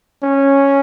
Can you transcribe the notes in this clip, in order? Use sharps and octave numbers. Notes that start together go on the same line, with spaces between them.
C#4